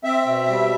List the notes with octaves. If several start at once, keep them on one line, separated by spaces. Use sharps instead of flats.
C4 E5
B2
G3